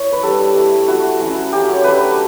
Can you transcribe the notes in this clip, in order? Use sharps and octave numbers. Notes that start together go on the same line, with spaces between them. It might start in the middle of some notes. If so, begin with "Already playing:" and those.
Already playing: E4 C#5
B4
G3 D4 A4
A3 E4
A3 E4 F#4
F#3 C#4 E4
F#3 C#4 E4 G4
C#5
A3 D4 B4